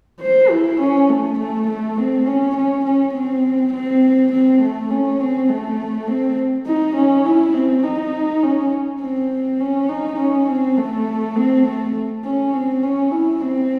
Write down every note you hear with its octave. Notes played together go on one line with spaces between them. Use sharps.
C5
E4
C#4
A3
A3
A3
C4
C#4
C#4
C#4
C4
C4
C4
A3
C#4
C4
A3
C4
D#4
C#4
E4
C4
D#4
C#4
C4
C#4
D#4
C#4
C4
A3
C4
A3
C#4
C4
C#4
E4
C4